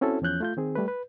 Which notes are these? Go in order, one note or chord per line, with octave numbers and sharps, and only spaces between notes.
C4 C#4 E4 F#4 A4
E2 F3 C#4 F#6 G6
A3 F4 G6
D#3 C4 G#4
G3 A3 B4
B4